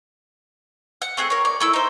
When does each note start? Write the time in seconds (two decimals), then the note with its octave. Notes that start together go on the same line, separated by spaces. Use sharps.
1.02 F#5
1.17 A3 C4 G#4 F#5
1.30 A#4 C#5
1.45 D5
1.60 A3 E4 E6
1.73 D#4 C5